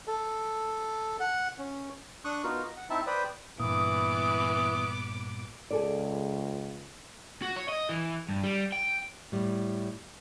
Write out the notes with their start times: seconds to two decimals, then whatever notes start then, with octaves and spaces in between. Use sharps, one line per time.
0.08 A4
1.20 F#5
1.58 C#4
2.25 D4 C#6 D#6 F#6
2.44 B3 D#4 F4 F#4 A#4
2.63 D#5
2.77 F#5
2.90 C4 D#4 E4 E5 A5
3.07 B4 C5 D5 G5 B5 D#6
3.59 G2 A#2 E3 B3 D6 D#6
5.71 C#2 G#4 A4 D5
7.42 F#4
7.56 C#5
7.68 D#5
7.89 E3
8.29 G2
8.44 G3
8.72 G5
9.32 A2 G3